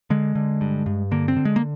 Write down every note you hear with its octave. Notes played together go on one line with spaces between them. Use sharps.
D3 G#3
D3
G2
G2
D3 A#3
C4
D3
G#3
A#3